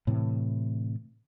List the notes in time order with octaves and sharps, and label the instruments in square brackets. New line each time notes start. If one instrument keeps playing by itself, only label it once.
[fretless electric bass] A2 C3 E3